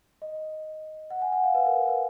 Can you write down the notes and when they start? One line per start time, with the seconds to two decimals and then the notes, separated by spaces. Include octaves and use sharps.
0.22 D#5
1.10 F#5
1.22 G#5
1.32 F#5
1.44 F5
1.55 B4
1.66 A#4
1.77 B4
1.88 B4